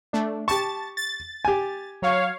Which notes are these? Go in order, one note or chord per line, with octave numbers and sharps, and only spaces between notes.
A3 D4
G4 A5 C#6 A6
A6
G4 G#5
F#3 C#5 F5